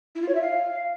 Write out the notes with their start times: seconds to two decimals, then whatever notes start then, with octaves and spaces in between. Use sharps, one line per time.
0.15 E4
0.22 F4
0.29 C#5
0.35 E5
0.42 F5